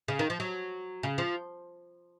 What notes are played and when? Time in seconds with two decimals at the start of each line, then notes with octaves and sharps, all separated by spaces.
0.08 C#3
0.19 D#3
0.30 F3
0.40 F#3
1.03 C#3
1.18 F3